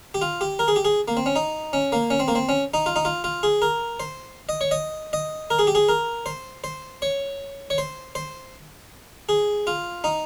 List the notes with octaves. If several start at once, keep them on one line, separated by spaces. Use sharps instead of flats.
G4
F4
G4
A#4
G#4
G4
G#4
A#3
C4
C#4
D#4
C#4
A#3
C#4
C4
A#3
C4
C#4
D#4
F4
D#4
F4
F4
G#4
A#4
C5
D#5
C#5
D#5
D#5
A#4
G#4
G4
G#4
A#4
C5
C5
C#5
C#5
C5
C5
G#4
F4
D#4